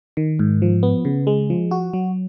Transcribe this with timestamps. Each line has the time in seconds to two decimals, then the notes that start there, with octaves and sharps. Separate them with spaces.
0.17 D#3
0.39 G#2
0.62 F3
0.83 B3
1.05 C#3
1.27 G#3
1.50 F3
1.71 F#4
1.93 F#3